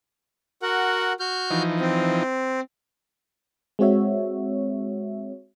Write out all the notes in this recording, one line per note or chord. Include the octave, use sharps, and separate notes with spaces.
F#4 A#4 F#5
F#4 F6 G6
E3 F3 D#4
C4
G#3 C4 F#4 C#5 E5